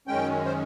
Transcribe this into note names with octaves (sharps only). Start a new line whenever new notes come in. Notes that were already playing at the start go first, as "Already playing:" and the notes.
F#2 D#3 G#3 C#4 G5
C5